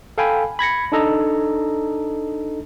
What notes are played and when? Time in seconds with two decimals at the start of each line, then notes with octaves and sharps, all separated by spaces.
0.18 A4 F5 G5 G#5 B5
0.59 B5 G#6 A#6 C#7
0.92 D4 D#4 A4 D#5 A#5